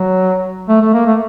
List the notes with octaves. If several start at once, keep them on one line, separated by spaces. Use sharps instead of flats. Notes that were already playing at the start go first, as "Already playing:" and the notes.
Already playing: F#3
A3
A3
A#3
A3